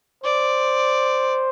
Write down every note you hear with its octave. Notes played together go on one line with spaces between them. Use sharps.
C5 D5